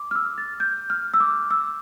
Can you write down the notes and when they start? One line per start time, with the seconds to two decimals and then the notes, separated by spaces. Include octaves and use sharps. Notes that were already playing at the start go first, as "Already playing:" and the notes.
Already playing: C6 D6
0.11 F6
0.15 E6
0.38 A6
0.60 G6
0.90 F6
1.14 E6
1.20 D6
1.51 E6